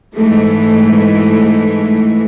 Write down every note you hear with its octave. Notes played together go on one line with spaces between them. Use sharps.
G#2 E3 G#3 A3